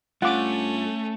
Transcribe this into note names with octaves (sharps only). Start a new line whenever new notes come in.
G2 A3 C#4 F4 F#5 D6